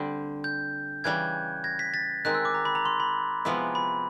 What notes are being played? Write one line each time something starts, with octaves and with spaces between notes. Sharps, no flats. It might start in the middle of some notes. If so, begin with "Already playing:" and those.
Already playing: D3 G3 C4
G6
C#3 E3 G3 F#6 G#6
G#6 A#6
B6
A6 B6
D#3 G#3 C4 F#6
E6
D6
A#5
B5
A#5
C6
B5
C3 F3 G#3 B3 E4
B5